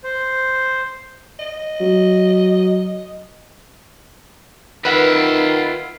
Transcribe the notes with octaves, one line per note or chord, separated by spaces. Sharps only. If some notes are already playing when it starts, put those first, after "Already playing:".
C5
D#5
F#3
D#3 F4 B4 E5 F#5